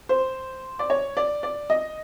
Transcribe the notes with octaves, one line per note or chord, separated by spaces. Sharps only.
C5
D5
C#5
D5
D5
D#5